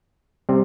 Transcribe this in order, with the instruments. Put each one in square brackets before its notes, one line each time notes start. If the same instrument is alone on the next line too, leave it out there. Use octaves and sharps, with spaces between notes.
[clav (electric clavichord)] C3 G3 C4